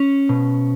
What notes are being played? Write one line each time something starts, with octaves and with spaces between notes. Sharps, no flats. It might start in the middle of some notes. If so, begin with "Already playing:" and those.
Already playing: C#4
B2